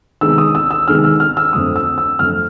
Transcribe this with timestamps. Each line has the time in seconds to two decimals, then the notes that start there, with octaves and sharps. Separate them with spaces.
0.21 C3 D#3 G#3 B3 D#4 E6
0.38 D#6
0.55 E6
0.71 E6
0.87 C3 D#3 G#3 B3 D#4 F6
1.04 E6
1.20 F6
1.37 E6
1.53 F2 D3 F3 A3 D#6
1.76 E6
1.98 E6
2.19 F2 D3 F3 A3 F6